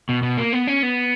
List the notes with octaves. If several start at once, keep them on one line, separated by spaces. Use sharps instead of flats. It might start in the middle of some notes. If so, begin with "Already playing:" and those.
B2
B2
A#3
B3
C#4
B3